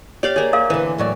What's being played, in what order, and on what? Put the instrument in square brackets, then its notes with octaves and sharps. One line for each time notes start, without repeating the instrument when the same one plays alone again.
[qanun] G4 D5 F5 [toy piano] C#5
[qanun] A#3 G#4 [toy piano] C#5
[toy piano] A#4 F5
[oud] D3 B4 [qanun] E3
[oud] A2 F#3 D5